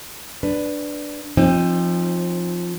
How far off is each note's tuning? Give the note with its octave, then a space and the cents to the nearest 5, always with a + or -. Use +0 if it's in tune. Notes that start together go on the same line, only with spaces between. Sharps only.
D4 +0 B4 +10
F3 +0 C4 +30 D#4 +0